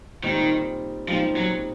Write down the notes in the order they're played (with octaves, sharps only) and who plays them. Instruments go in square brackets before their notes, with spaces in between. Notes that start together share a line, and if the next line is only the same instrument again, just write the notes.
[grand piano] A#2 G3 C4 D#4 [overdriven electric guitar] D#3
[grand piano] A#2 G3 C4 D#4 [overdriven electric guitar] F3
[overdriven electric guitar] F#3